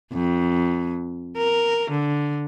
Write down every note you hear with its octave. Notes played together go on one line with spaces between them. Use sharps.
F2
A#4
D3